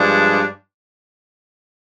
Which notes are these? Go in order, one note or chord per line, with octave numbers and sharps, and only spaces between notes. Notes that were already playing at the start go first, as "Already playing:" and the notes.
Already playing: G2 F3 G#3 D4